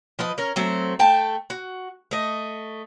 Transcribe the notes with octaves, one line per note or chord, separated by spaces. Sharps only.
F3 B4 D#5
C#4 A#4
F#3 A3 C4
A3 G5 A5
F#4
A3 D#5